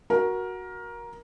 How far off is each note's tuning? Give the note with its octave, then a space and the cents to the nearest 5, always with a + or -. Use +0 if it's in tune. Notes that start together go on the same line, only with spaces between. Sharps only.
F#4 +0 A#4 +15